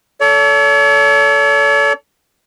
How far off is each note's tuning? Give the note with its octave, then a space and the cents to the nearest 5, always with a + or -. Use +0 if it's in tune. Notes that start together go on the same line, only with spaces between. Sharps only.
A4 +0 C#5 +45